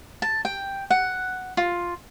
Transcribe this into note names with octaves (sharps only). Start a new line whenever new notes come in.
A5
G5
F#5
F4